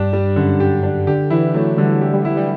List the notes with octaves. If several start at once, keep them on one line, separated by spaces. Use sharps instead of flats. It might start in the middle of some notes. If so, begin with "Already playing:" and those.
Already playing: G2 D4 G4
G3
F#2 D3
G4
D4
D3 G4
E3 E4
F#3 A3
D3 G3
G4
G3
E4
G3